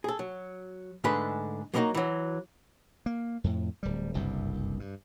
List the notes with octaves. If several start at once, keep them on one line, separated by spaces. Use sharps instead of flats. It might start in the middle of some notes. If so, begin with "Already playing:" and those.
G#4 A4
F#3
G#2 D3 G#3 A3 B4
F#3 A#3 B3 C#4 D#4 F#4
E3 F#3
A#3
F2 A2
D1 G3
F#1 C2 G2 C3
G2